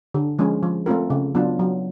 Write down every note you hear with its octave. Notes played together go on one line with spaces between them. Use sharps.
D3
F3 G#3 C#4
F3
A3 C4 F4 A#4
C#3
F#3 B3 D4 F4
F#3